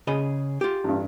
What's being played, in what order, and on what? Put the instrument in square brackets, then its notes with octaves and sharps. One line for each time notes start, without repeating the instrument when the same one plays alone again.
[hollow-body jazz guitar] C#3 D#5 B5 [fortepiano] G#4
[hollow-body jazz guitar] F4 G4
[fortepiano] A1 G2